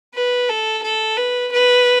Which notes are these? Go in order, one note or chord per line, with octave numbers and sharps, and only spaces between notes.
B4
A4
A4
B4
B4